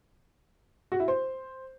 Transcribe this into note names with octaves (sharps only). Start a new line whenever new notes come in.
F#4
E4
C5